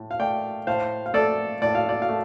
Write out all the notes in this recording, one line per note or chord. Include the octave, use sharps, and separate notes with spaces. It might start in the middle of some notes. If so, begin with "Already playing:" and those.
Already playing: A2
F5
A3 D5 G5
A2 C5 F5
F5
A3 A4 D5
A2 D5
F5
D5
F5
A3